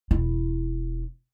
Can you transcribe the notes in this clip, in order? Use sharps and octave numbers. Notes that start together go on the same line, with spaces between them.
E1 E4